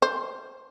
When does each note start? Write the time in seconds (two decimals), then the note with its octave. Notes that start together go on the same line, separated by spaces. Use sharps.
0.02 C5